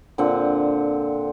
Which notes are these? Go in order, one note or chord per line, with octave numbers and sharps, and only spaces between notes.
A#2 D3 C4 F#5